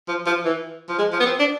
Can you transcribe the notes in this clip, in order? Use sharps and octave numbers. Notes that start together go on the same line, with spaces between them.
F3
F3
E3
F3
G#3
F3
B3
C4
D4